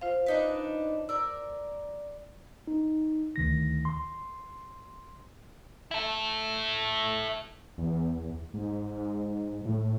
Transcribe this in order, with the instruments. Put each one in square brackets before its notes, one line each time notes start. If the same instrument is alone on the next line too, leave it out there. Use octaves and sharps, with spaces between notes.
[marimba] F4 C5 F5
[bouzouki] D4 D#4 B4
[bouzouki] A#4 D5 [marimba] E6
[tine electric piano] D#4
D2 D#3 A#6
C6
[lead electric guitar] E4 A4
[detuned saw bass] E2
G#2
A2